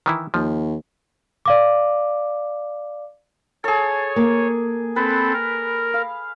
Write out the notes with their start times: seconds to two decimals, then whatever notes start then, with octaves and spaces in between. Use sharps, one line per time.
0.06 D#3 E3 E4
0.34 D#2 F3
1.46 D5 F5 D6
3.64 G#4 A4 C#5
4.16 A#3
4.96 C4 A4 B4
5.34 A#4
5.94 F5